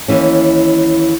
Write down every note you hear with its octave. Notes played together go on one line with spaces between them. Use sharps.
D#2 E3 C#4